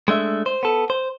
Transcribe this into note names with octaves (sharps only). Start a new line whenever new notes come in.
G#3 A3 D4 E5
C5
B3 A4
C5